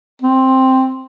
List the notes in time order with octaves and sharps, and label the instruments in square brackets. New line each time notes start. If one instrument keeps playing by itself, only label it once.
[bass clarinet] C4